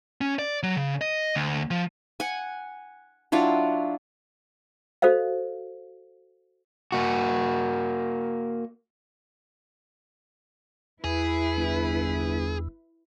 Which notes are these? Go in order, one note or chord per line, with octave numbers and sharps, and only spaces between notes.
C#4
D5
F#3
C#3
D#5
D2
F3
F#5 G#5
F#3 D4 E4 F4
F#4 A4 C5 D#5 F5
A#3 F#4
E2 E4 G#4 B4
G1